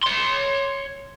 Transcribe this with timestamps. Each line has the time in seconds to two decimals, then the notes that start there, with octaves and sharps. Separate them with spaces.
0.03 C#5 C6